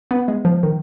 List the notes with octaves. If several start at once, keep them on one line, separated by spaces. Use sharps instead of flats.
B3
G#3
F3
D#3